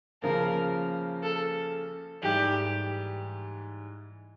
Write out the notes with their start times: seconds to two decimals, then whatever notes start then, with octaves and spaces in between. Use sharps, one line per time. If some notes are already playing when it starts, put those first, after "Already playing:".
0.22 C#3 F3 A#3 A#4
1.23 A4
2.23 G#2 E3 G3 G4